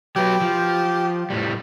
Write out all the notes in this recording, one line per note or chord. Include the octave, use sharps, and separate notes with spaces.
F#3 G4 B4
F3
A2 G3